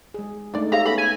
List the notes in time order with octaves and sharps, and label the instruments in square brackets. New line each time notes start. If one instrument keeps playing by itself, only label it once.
[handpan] G#3 G#4
[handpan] A3 D#4 [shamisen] D4 D5
[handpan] G4 E5 [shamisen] G#4 C#5 F5 [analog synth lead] A#5
[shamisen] A3 B3 C#4 [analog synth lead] B5
[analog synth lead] G#5